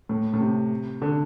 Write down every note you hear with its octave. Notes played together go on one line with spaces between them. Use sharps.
A2
A2
C3
D3